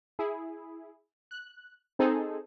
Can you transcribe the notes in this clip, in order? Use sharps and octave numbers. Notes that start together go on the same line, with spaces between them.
E4 G#4
F#6
C4 D#4 G#4 A4 C5